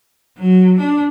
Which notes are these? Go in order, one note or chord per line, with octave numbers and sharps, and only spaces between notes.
F#3
D4